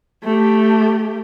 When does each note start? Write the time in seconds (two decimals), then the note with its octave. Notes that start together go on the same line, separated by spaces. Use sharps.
0.24 A3 G4